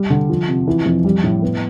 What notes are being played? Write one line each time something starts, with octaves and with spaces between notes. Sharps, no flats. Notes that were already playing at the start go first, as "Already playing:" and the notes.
Already playing: G3
D3
F3
C3
E3
F2
G3
A2
B3